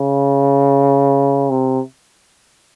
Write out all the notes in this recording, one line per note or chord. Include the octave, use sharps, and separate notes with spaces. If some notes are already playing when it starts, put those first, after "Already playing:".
Already playing: C#3
C3